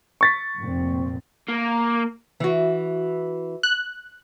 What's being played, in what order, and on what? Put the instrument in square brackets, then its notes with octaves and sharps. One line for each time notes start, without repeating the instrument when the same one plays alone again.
[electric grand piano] C#6 A6 B6
[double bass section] F1 A#2 C4
[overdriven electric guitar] A#3
[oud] E3 F#4
[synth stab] F#6